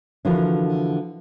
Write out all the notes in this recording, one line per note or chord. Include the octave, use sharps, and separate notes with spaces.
D3 E3 F3 E4 F#4 A#4